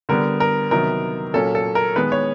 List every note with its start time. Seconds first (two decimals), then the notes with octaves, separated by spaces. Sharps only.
0.09 D3 G3 B3 A#4
0.40 A#4
0.71 C3 D#3 F#3 B3 A#4
1.34 A#2 F#3 A#3 C#4 A4
1.55 A4
1.75 A#4
1.96 D#3 G#3 B3 B4
2.12 C#5